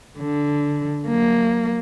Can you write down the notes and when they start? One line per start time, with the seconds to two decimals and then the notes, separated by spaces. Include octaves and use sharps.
0.19 D3
1.08 F#3 A#3